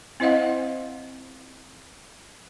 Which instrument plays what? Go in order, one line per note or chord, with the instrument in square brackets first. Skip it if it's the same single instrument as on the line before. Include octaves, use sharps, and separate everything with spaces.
[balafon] C4 E4 C5 D#5 F5 F#5